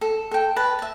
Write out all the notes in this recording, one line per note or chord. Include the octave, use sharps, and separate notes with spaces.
A4
A4 G5
B4 A5
E5 A5